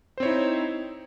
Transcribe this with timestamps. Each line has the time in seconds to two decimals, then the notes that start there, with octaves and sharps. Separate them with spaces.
0.18 C5
0.20 C4
0.23 C#5
0.25 E4
0.28 D#4